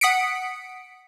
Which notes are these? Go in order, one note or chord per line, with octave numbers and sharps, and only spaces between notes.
F#5 D#6 B6 C#7 D7